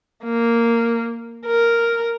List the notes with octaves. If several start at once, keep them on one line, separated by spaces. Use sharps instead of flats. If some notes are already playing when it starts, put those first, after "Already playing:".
A#3
A#4